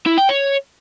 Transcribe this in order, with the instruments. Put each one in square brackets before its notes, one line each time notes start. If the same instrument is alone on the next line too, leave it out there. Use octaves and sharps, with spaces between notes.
[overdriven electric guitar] E4
G5
C#5